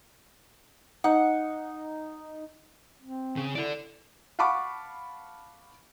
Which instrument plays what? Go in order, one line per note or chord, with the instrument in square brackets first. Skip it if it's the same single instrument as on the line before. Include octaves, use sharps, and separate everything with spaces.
[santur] D#4 [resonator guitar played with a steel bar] F#5
[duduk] C4
[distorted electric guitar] C#3
[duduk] E4 [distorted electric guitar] A4 D5
[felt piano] F5 F#5 A5 B5 C#6 D6